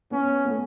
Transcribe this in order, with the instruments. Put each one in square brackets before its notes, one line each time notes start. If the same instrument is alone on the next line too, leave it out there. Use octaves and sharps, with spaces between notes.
[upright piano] B3 [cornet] C#4
[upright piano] B3
A3